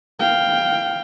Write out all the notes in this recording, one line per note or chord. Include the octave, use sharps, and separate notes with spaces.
F5 G5